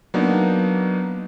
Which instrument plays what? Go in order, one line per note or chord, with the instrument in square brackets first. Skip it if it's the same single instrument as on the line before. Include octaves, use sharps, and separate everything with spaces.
[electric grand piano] F#3 A#3 B3 D4 D#4